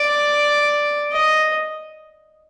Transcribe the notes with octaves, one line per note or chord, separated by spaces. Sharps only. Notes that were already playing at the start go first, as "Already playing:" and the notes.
Already playing: D5
D#5